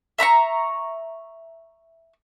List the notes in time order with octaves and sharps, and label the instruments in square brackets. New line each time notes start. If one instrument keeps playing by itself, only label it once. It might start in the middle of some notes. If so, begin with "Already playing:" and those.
[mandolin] E5 A#5 B5 C#6